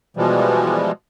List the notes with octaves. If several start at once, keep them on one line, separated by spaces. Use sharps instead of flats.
B2 E3 F3 G3 G#3